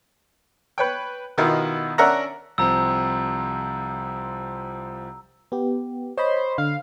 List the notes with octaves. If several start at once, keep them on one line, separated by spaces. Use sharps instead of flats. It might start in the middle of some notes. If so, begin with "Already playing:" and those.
B4 C#5 G5
B2 D#3 B3 E4 F4
C#4 D4 A#4 E5 F#5 A#5
C2 F3 C4 A#5 E6
B3 G4
C5 C#5 D#5 B5
D3 F5